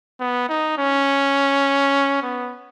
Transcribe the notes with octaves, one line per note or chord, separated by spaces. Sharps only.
B3
D#4
C#4
B3